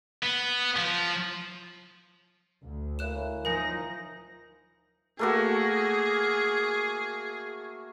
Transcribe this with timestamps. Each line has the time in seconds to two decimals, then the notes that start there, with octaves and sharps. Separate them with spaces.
0.23 B3
0.76 F3
2.64 D2
2.99 A#3 C#4 E4 F#6 E7
3.45 F3 D#4 A#4 G#5 A#6
5.19 A3 A#3 F#4 G#4